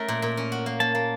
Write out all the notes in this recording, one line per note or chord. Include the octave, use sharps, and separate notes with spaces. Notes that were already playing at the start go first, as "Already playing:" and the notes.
Already playing: A3 C#4 A#4
A#2
A#2
C#4
F#4
A#3
A#3 A5
A#3